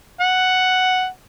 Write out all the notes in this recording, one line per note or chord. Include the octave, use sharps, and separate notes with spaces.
F#5